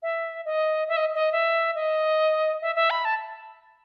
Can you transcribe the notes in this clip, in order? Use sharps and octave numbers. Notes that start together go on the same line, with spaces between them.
E5
D#5
E5
D#5
D#5
E5
D#5
E5
E5
B5
A5